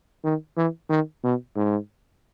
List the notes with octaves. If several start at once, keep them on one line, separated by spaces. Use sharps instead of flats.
D#3
E3
D#3
B2
G#2